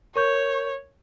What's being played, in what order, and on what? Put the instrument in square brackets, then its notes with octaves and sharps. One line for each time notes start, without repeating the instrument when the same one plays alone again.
[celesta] A#4 C#6 G6 [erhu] C#5